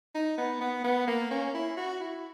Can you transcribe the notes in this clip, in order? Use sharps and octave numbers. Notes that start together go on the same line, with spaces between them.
D#4
B3
B3
B3
A#3
C#4
E4
F#4
E4